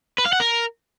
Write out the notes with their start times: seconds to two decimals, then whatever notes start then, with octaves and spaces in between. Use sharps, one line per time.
0.18 B4
0.26 F5
0.33 F#5
0.40 A#4